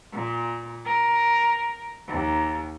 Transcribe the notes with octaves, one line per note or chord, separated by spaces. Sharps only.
A#2
A#4
D#2